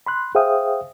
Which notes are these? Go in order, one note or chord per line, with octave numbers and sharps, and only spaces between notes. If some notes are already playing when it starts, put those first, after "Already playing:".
B5 C6 F#6
G#4 C5 E5 F5 G5 D#6